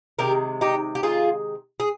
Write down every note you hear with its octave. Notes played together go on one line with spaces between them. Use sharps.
C3 D#3 G#3 G4 A#4
D#4 G4
G4
F4 G#4
G#4